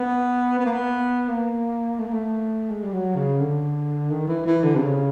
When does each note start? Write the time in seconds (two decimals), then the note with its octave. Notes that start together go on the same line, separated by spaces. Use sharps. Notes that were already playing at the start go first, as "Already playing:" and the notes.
Already playing: B3
0.59 B3
0.65 A#3
0.73 B3
1.28 A#3
1.99 A3
2.07 A#3
2.13 A3
2.70 G#3
2.84 G3
2.93 F#3
3.16 C#3
3.40 D3
4.11 D#3
4.27 E3
4.46 E3
4.64 D3
4.75 C3
4.81 C#3